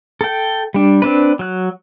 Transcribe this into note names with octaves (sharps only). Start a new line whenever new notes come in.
A4 G5
G3 D4
C4 D4 B4
F#3 F#6